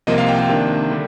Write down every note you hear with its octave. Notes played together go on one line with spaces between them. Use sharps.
C2 C3 F3 A#3 D#5
F5
G5
G5
C3 D#3 A#3 D4
D3 G3